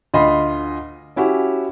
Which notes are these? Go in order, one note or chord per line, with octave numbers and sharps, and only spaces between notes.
D2 F4 D#5 B5 C6
C#4 E4 F#4 G4